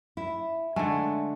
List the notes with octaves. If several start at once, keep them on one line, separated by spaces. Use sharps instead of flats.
E4
D3 G#3 A3 G#5